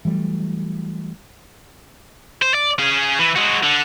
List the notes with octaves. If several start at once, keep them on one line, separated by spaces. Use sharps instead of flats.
E3 F#3 G3 A3
C5
D5
C#4 G#4
E3
G#3 F#4
D3